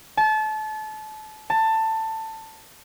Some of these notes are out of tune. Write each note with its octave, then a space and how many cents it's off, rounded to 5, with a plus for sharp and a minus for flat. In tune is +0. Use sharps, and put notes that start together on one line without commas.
A5 -30
A5 +15